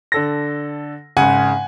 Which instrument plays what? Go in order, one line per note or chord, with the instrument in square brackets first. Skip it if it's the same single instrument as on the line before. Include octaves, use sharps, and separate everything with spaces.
[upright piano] D3 A4 A#6
[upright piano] G#1 C#3 [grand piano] F#5 G#5